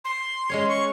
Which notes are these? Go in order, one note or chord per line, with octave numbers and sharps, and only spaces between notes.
C6
G#3 C#4 C#5
C#6